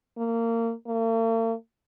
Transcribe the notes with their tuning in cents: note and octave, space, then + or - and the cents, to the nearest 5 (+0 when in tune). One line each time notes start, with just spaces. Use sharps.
A#3 -25
A#3 -45